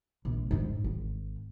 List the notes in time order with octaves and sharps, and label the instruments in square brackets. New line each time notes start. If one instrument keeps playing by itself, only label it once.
[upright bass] A#1
G#2 D4
G#1